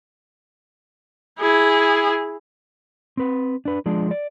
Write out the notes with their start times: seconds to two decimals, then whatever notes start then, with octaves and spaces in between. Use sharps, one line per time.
1.39 E4 G#4
3.17 C4 B4
3.65 D4 B4
3.86 F3 G#3 D4
4.11 D5